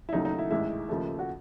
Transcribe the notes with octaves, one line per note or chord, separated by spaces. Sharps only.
E4
D#2 C#3 F#3 A3 D#4
D#4
E4
A1 G#2 D#3 G#3 E4
D#2 C#3 F3 A3
F#4